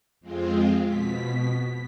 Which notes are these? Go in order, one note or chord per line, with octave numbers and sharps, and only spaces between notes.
F2 G#3 C4 F4
B2 B6